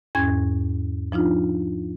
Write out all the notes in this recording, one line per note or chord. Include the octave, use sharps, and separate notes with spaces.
E2 G#2 C#4 G#6
F3 D4 D#4 F4